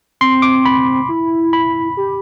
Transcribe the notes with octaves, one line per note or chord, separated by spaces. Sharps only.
C4 C6
D6
B5
E4
B5
G4